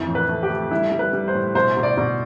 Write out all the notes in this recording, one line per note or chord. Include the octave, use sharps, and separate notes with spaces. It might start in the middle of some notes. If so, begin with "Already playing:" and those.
Already playing: F2 E3
A2
B4
A3
G4
A3
G3 E4
G3
B4
G3
C5
A2
B2 C5
B2
D5
B2